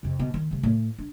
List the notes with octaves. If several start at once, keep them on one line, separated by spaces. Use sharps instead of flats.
F2 C3
B2
D#3
C3 A3
A2
D4